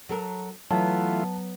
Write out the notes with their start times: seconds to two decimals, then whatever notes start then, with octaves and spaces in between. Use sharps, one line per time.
0.09 F#3 A4 A#4
0.71 E3 F#3 A3 B3 F4 A5